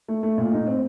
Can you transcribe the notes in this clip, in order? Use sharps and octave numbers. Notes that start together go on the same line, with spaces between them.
A3
A3
A#2
D#4
C4